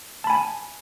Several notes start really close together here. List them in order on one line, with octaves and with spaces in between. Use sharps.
A5 B5 G#5